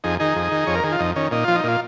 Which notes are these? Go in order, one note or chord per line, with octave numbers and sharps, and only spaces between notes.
F2 D#4 G#4
D#3 D#4 G#4
F2
D#3
F2 C#5
A#4
D#3 G#4
F4
F2 D#4
D#3 C#4
A#2 D#4
F3 F4
D#4
A#2 F4